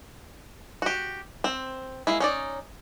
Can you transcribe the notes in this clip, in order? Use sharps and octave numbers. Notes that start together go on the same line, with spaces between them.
F#4 G4
C4
G#3 A#3 E4
C#4 D#4 D5